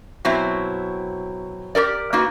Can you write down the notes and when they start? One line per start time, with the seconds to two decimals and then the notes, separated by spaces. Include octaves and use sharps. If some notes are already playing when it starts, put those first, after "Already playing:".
0.25 B2 F#3 C4 E4
1.75 G4 A4 A#4 D5
2.13 A#3 B3 D#4 F#4